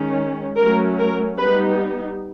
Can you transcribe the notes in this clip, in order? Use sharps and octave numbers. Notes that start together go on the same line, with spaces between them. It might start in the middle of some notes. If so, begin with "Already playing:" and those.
Already playing: D#3 G#3 C#4
F#3 A3 C#4 A#4
A#4
G3 B3 D#4 B4